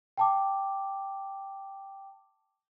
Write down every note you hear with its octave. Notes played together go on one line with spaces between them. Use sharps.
G5 A5 D6